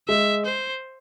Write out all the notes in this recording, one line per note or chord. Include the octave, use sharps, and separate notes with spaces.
G#3 E5
C5